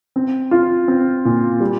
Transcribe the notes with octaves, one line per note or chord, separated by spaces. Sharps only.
C4
F4
C4
A#2
G3